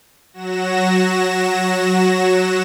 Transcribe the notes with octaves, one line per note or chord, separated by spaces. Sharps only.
F#3 F#4 A#6 E7